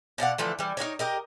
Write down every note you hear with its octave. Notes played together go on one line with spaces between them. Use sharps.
B2 D5 F5 F#5
D3 E3 F3 A3
E3 G3
D#4 F#4 A#4 C#5
G4 A#4 D#5